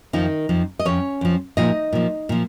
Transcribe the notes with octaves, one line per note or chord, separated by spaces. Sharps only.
F2 D#3 F3 D#4
F2 F3
D#5
F2 F3 C#4 C#5
F2 F3
A#2 F3 D#4 D#5
A#2 F3
A#2 F3